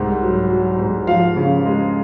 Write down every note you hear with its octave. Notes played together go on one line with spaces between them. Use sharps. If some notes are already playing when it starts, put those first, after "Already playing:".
Already playing: C2 G#2 F#5
F#3
F#3
G#2
F3 F5
C#3
G#3